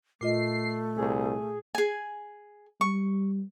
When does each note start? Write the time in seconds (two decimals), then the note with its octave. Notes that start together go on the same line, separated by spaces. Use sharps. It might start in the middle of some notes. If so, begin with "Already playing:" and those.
0.21 A#2 A3 F4 D#5 C7
0.98 C2 G#4
1.75 G#4 G#5
2.81 G3 C#6